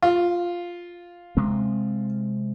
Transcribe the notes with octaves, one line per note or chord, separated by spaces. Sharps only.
F4
C3 G#3 C4